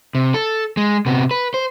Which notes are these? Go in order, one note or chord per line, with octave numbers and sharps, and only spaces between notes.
C3
A4
G#3
C3 B3
B4
C5